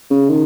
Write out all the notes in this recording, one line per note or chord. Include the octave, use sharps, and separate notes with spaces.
C#3
D#3